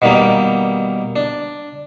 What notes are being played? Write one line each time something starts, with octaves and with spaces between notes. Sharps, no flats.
B2 D#3 G3 A#3
D4